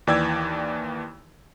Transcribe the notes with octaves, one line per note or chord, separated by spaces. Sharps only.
D#2 E3 D5 G5 E6 G#6